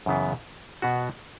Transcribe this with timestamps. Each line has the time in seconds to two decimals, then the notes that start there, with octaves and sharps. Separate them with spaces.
0.06 F#2 C#3 E3 B3
0.82 B2 B3 F#4